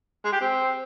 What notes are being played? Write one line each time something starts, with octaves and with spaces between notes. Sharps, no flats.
G#3
G4
C4